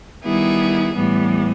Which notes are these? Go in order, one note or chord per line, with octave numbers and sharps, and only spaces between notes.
D#3 G3 B3 E4 G#4
A2 E3 G3 B3